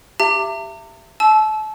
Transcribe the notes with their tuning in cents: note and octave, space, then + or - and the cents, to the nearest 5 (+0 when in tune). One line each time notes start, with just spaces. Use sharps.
G4 +5 E5 +25 A#5 -45
A5 -30 E6 -5